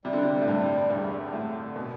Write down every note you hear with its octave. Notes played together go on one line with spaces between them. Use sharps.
C3 G3
D3
C3
G3
A2
G2
G3
E2 G2
E2
A2
D3
B2 B3